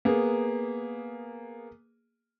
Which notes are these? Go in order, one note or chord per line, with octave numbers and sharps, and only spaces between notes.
A#3 B3 G#4